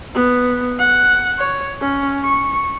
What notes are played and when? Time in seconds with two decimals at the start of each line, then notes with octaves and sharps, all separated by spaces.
0.14 B3
0.79 F#5
1.38 C#5
1.81 C#4
2.24 C#6